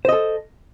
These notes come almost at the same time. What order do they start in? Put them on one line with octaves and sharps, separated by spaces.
C5 D#5 A4